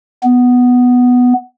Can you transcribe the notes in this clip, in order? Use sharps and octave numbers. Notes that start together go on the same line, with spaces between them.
B3